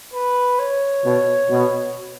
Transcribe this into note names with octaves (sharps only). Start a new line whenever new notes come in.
B4
C#5
B2
B2